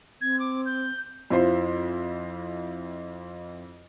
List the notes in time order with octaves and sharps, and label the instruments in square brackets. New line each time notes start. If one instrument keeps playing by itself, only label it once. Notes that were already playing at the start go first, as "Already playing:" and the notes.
[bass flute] C4 [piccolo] G#6
[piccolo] D6
G6
[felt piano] F2 E4 F4 C5 C6